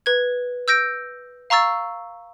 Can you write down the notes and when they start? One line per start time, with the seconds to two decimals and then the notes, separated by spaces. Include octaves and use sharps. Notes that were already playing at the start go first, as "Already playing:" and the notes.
0.06 B4 G#6
0.68 E6 G6 A#6 D7
1.50 F5 A#5 C#6 E6 A6